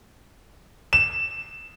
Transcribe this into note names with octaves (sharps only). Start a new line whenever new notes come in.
E7